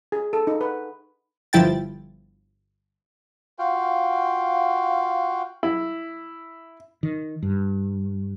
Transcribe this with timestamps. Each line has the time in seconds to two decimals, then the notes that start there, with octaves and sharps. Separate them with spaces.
0.12 G#4
0.33 A4
0.47 D#4
0.61 B4
1.53 G1 F3 E4 G5 A6
3.59 F4 F#4 F5 G5
5.63 E4
7.03 D#3
7.43 G2